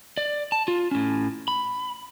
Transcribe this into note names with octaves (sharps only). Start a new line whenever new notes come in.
D5
A5
F4
A2 C#4
B5